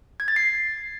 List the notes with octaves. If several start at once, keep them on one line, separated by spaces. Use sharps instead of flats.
G#6
A6
C7